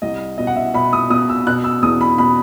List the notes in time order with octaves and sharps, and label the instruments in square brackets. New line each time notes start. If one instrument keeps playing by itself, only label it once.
[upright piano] C2 D#5
B2 D#5
F#5
E5
B2 B5
D#6
B2 D#6
E6
B2 F#6
E6
E2 D#6
B5
B2 B5